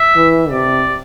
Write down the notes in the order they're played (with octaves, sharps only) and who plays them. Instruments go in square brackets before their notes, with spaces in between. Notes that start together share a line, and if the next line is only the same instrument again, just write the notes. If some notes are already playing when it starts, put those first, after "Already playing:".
Already playing: [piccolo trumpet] E5
[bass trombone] E3
[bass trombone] C3 [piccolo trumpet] D5